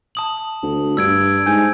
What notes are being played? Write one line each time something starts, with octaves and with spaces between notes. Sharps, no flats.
A5 D#6 F#7
D2
G2 E6 G#6 D7
G#2 G#5 G6